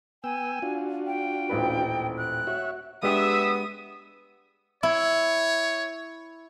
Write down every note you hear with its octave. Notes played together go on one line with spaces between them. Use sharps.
B3 G5 G#5 E6
D4 F4 F#4
G5
D#1 A1 B4
F#6
F#4 C#5 E5
G#3 B3 D4 G4 E5 D#6
E4 C#5